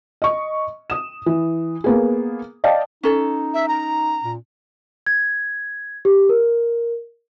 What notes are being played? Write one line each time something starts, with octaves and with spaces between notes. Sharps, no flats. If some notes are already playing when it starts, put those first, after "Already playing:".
D#5 C#6
D#6 E7
E3
A#3 B3 G#4
D5 D#5 F5 G5 A5
C#4 D#4 A4
E5
A#5
A#2
G#6
G4
A#4